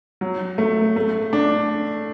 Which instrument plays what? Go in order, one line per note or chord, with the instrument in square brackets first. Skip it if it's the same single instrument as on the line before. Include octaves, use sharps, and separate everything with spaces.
[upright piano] F#3
A3
A3
D4